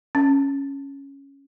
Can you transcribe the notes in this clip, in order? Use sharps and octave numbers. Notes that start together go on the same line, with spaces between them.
C#4